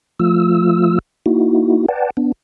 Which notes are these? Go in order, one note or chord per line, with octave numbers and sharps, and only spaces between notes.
F3 A3 F4 E6
A#3 D#4 E4 F#4
B4 D5 F#5 G5 A5
B3 D4